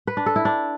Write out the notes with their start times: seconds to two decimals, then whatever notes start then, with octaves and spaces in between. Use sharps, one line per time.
0.07 B4
0.17 D4
0.26 A4
0.36 E4
0.45 D4